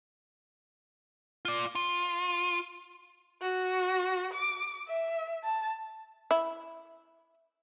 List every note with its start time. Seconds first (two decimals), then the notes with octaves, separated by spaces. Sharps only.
1.45 F4 D5
1.75 F4
3.42 F#4
4.33 D6
4.88 E5
5.44 A5
6.31 E4